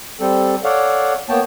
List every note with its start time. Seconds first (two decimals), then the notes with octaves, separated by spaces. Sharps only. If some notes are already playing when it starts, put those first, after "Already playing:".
0.20 G3 C4 A4
0.64 A4 C#5 D5 F5 F#5
1.29 A#3 B3 C#5 G5 A5